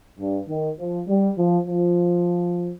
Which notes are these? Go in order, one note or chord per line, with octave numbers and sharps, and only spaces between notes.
G2
D#3
F3
G3
F3
F3